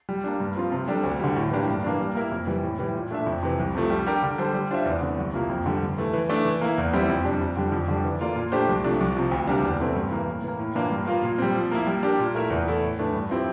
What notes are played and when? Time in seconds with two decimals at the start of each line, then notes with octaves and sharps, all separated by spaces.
0.09 G3
0.24 A#3 D4
0.40 G2
0.56 F3 C4 F4
0.72 C3
0.88 G3 D4 A4
1.03 D2
1.19 D3 G3
1.36 A2
1.51 E3 A#3 D4 G4
1.68 G2
1.84 E3 A#3 D4
2.00 G3
2.15 A#3 E4 A#4
2.32 F2
2.47 E3 G3
2.63 A2
2.79 E3 G3
2.95 A#2
3.11 A3 D4 A4 E5
3.26 F2
3.43 C3 E3
3.59 C2
3.75 C3 F3 A3
3.90 G3
4.07 D4 G4 A#4
4.23 D3
4.38 G3 D4 A4 C5
4.54 G3
4.71 D4 F4 C5 E5
4.85 E2
5.01 D3 A3 C4
5.18 C2
5.34 C3 F3 A#3 E4
5.50 F2
5.66 D3 G3
5.82 G2
5.98 E3 A3
6.13 E3
6.29 A3 D4 A4 D5
6.45 E3
6.61 A#3 E4
6.78 E2
6.93 E3 G3 C4 E4
7.09 F2
7.25 C3 G3 D4
7.41 F2
7.57 D3 G3 D4
7.72 F2
7.88 D3 G3 D4
8.05 E3
8.21 A#3 F4 A4 D5
8.36 A#2
8.52 A3 D4 G4 C5
8.69 C2
8.84 C3 F3 A3 D4
9.01 C2
9.17 C3 F3
9.31 D2
9.47 C3 G3 A#3 D4
9.63 E2
9.80 C3 E3 A3 C4
9.95 G2
10.12 E3 A#3
10.28 A2
10.44 E3 A#3
10.59 A2
10.75 E3 A#3 D4 F4
10.91 G2
11.07 F3 A#3 F4
11.23 A#2
11.38 G3 C4
11.55 F3
11.71 A#3 E4
11.87 G3
12.03 D4 G4 A#4
12.19 A#2
12.35 A3 E4 A#4 E5
12.50 E2
12.66 E3 A3 E4 A4
12.82 A2
12.99 E3 A3 D4
13.14 G2
13.29 F3 C4 E4 G4